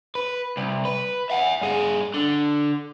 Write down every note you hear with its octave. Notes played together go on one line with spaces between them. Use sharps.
B4
C2
B4
E5 F#5
G2 G#4
D3